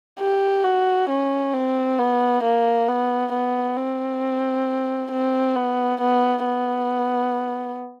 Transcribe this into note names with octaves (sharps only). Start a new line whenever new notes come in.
G4
F#4
C#4
C4
B3
A#3
B3
B3
C4
C4
B3
B3
B3